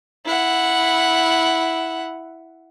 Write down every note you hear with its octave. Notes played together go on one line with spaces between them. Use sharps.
E4 F#5